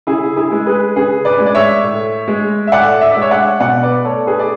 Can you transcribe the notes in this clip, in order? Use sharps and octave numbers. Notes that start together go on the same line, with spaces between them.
C#3 E4 G#4
E4 G#4
G#3
G#4 B4
C#3 G#4 B4
B4 D5
G#3
D5
C#5 E5
A2
G#3
E5
A2 D5 F#5
E5
D5
G#3
C#5 E5
D5 F#5
B2 D5 F#5
B4 D5
A3 A4 C#5
G#4 B4
D5